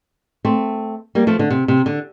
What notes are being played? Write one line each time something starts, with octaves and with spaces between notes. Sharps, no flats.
A3 C4
G3 A#3
F3 A3
D3
C3
C3
D3